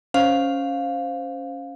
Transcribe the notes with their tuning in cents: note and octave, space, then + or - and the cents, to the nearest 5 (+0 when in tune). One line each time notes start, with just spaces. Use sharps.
C#4 +0 C5 -5 F5 +10